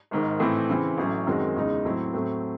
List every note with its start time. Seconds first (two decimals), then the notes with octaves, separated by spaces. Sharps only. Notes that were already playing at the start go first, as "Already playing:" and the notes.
0.11 G#1 G#2 D#3
0.40 A2 E3 C4 E4
0.69 C#3 E3 C4 E4
0.97 A1 A2 F#3 C#4
1.27 F#2 D#3 G#3 C4 F#4
1.56 E2 C#3 G#3 D#4
1.85 A2 F#3 C4 E4
2.14 A2 F#3 A3 C4